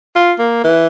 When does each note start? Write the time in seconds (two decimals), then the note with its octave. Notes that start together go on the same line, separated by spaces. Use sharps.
0.16 F4
0.39 A#3
0.64 E3